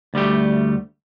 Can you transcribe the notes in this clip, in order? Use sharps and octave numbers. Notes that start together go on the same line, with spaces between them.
D2 G3 A3 G4